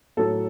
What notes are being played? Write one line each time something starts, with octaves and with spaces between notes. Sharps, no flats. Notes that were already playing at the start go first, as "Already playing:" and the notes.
A2 F#3 A4